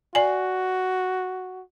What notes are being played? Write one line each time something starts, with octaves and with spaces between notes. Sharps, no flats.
F#4 D5 G#5